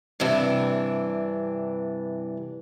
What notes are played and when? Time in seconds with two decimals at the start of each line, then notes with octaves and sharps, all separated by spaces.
0.20 G2 C3 E3 D4